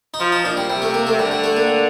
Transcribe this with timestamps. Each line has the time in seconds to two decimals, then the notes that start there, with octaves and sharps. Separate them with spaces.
0.14 D#4
0.20 F3 F4
0.32 D#4
0.45 A#2 D4
0.57 G3
0.70 C3 G3
0.82 A3
0.94 A#3
1.07 A3
1.19 D3 G3
1.31 G3
1.44 A3
1.57 A#3